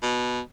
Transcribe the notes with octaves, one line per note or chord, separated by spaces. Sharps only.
B2